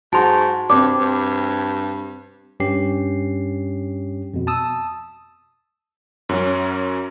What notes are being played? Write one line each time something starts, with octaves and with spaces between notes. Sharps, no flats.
G#2 F#4 A5 C6
G2 C4 D5 D6
G2
G2 C#4 G4 C7
F2 B2
A5 D#6 E6
F#2 F#3 C#4